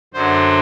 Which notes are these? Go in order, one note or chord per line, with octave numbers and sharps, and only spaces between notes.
F#2 D3 F#3 C5